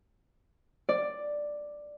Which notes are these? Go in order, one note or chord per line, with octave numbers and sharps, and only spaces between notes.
D5